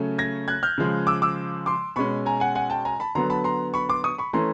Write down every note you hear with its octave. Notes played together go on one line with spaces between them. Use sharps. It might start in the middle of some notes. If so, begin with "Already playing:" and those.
Already playing: C#3 F#3 A3 C#4
G#6 A#6
F#6 G#6
F6 G6
C#3 F3 G#3
D6 E6
D6 E6
C6 D6
B2 G#3 C#4 B5 C#6
G#5 A#5
F#5 G#5
F#5 G#5
G5 A5
G#5 A#5
A5 B5
D3 F#3 B3 A#5 C6
A5 B5
A#5 C6
B5 C#6
C6 D6
C#6 D#6
B5 C#6
E3 A3 C#4 A#5 C6